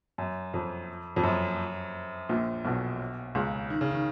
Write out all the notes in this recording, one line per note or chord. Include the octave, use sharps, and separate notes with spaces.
F#2
F2
F2
F#2
A#1 A#2
B1 B2
C#2 C#3
D#3
C#3
D#3